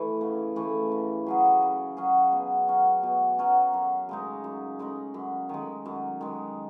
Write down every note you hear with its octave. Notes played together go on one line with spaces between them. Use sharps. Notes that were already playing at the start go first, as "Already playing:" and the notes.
Already playing: E3 A3
C#3
E3 A3
C#3
F#3 C#4 G#4
C#3
F#3 C#4 G#4
B2
F#3 C#4
B2
F#3 C#4
F#2
C#3 G#3 D#4
F#2
C#3 G#3 D#4
F#2
D#3 G#3
F#2
D#3 G#3